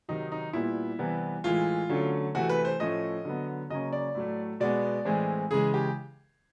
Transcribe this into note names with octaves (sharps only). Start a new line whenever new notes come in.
C3 D#3 F#3 D#4
D#4
A#2 G3 B3 E4
C3 E3 G3 B3
A2 E3 G#3 F4
D3 F#3 A3 C#4
C3 E3 A3 F#4
B4
C5
A2 F3 A3 C#4 D#5
D3 F#3 B3
C#3 F#3 A#3 C#4 D#5
D5
A2 F#3 A3
B2 G#3 B3 D5
A2 E3 G#3 C4
C#3 E3 G#3 G#4
G4